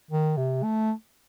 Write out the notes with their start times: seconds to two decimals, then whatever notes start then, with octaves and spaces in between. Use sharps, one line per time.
0.11 D#3
0.37 C3
0.64 A3